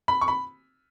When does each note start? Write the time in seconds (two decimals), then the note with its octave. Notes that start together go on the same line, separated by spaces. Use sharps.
0.08 B5
0.21 C#6
0.28 B5